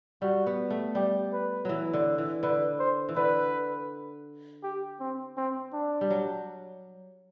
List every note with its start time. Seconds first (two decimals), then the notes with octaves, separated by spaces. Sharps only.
0.22 G3 F#4
0.47 B3
0.70 A3
0.95 G3 G4
1.33 B4
1.65 E3 F#3
1.93 D3
2.18 E3
2.43 D3 B4
2.80 C5
3.09 E3
3.16 D3 B4
4.63 G4
5.00 C4
5.37 C4
5.74 D4
6.01 G3
6.10 F#3